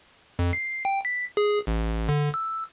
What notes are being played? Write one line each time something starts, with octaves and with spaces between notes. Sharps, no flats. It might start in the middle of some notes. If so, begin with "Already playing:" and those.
F2
C7
G5
B6
G#4
A1
D3
E6